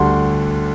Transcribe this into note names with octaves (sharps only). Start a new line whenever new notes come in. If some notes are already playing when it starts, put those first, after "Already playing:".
Already playing: D2 D3 G3 C6